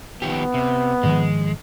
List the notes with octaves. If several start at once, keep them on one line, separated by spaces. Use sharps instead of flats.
D#3 F3 B3 G4
C3
G#2 D#3 F3 G#3